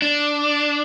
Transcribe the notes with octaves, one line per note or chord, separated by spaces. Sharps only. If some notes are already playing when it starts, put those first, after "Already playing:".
D4